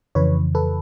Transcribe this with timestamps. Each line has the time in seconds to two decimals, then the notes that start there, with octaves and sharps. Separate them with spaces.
0.15 F2 C#3 E3 B4 C#5
0.55 A4 B4